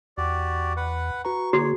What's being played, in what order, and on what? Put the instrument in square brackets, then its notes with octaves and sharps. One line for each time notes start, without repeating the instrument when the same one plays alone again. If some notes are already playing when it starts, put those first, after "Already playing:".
[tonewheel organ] E2 [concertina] F#4 G4 D5
[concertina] B4 F#5
[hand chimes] F#4 B4 A#5 [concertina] C#6
[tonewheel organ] D3 A#3 [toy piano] F#4 [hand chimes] G#4 [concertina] C#5